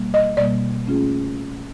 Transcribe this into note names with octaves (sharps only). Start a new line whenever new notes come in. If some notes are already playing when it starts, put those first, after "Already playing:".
Already playing: B2 G3 A#3
D#5
B2 G3 A#3 D5
A3 C#4 F4 G#4